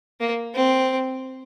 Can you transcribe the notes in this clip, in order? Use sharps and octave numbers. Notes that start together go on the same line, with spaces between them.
A#3
C4